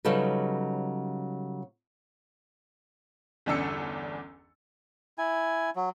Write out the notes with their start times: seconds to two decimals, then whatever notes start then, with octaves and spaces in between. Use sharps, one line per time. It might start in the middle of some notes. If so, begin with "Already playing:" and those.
0.05 C#3 F#3 G3 D#4 A4 B4
3.46 G1 E2 C#4 D4 E6 C#7
5.18 E4 G#5
5.76 F#3